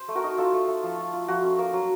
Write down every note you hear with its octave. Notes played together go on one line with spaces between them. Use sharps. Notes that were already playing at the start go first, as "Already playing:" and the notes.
Already playing: C5
A3
F#4 A#4
D#4
D#4 F4 A4
A3
A3
F3
F4
F4
F3 F#4
C#4
A#3
F#3